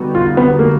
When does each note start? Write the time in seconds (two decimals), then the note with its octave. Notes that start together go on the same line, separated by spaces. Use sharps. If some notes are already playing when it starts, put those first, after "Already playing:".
Already playing: D3 G3 B3 D#4 F#4
0.15 F4
0.37 B3
0.59 A#3